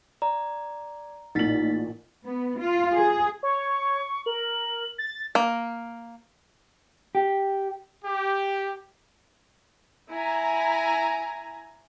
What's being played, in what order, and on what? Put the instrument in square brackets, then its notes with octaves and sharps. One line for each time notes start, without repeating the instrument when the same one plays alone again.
[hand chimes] D5 [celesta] A#5
[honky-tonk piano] A1 A#2 F#7 [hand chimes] D#4 A6 B6
[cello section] B3
F4
G#4
[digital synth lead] C#5 [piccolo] C#6
[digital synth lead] A#4 [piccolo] F#7
[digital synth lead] A6
[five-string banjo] A#3
[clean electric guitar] G4
[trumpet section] G4
[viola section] E4 G#5 A#5